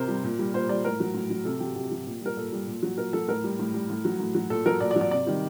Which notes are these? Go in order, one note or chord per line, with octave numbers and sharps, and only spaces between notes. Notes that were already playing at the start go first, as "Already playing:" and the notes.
Already playing: C3 A#4 C5
G3
A#2
G3
A#2 C5
G3 D5
A2 A#4
F#3
A2
F#3
C3 A4
F#3 G4
C3 G4
F#3
A#2
G3 A#4
A#2 A4
G3
A#2
F#3
A#2 A#4
F#3 A4
A2 A#4
G3
A2
G3
A2
F#3
A2
F#3
A#2 A4
F#3 A#4
A#2 D5
D5
F#3
D5
C3 D5
D#3 G3